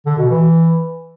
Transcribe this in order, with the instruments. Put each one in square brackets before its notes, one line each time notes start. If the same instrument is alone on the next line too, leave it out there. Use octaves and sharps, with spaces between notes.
[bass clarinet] D3
B2
E3